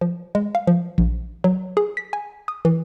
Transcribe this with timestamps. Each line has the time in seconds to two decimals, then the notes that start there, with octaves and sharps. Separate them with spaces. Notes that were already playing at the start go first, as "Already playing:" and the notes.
0.01 F3
0.35 G#3
0.55 F5
0.67 F3
0.98 A#1
1.44 F#3
1.77 G#4
1.97 B6
2.13 G#5
2.48 D#6
2.65 E3